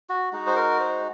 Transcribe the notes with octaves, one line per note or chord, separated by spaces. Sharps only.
F#4
G#3 D#4 F#4
C5
A#4
C5